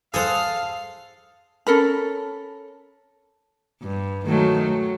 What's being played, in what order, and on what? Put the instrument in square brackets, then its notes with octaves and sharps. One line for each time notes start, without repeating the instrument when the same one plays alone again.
[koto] G#4 C5 F#5 [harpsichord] A4 D#6 [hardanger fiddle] F5
[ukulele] C#4 A4 A#4 B5
[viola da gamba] G2
[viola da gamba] D#3 F#3 G#3 [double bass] A3
[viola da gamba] F#3